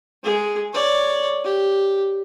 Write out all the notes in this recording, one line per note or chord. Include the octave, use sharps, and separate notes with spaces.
G#3 G#4
C#5 D5
G4